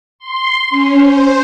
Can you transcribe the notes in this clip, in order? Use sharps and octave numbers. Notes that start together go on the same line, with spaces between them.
C6
C#4
C5